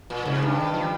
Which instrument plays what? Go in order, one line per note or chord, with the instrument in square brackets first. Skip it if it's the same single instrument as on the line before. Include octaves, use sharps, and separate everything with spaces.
[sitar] A#2
[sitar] G#2 [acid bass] C#3
[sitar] G2
[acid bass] D#3
F3